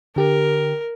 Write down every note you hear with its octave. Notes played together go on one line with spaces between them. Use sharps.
D3 G4 A#4